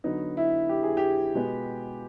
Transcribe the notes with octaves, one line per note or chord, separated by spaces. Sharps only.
D3 F#3 B3 D#4
E4
G4
G#4
G4
B2 G#3 B3